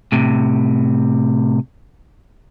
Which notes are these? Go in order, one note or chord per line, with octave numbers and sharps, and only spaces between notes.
A2 C3